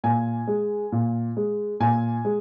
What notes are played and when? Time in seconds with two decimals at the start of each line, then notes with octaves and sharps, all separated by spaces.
0.04 A#2 G#5
0.48 G#3
0.92 A#2
1.37 G#3
1.80 A#2 G#5
2.25 G#3